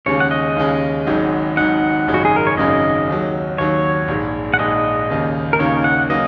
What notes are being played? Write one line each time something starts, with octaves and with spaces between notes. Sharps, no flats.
D#2 C#3 G#3 C#4 C#5
F#5
D#5
D#2 C#3 G#3 C#4
G#1 G#2 F#3 D#4
G#1 G#2 F#3 D#4 F#5
G#1 F#2 C#3 G#3 D#4
F#4
G#4
A#4
C#5
G#1 F#2 C#3 G#3 D#4 D#5
D#2 D#3 F#3
D#2 D#3 F#3 C#5
A#1 G#2 G#3
F#5
A#1 G#2 G#3 D#5
D#2 C#3 A#3 D#4
A#4
D#2 C#3 A#3 D#4 C#5
F#5
C#3 F#3 A#3 D#5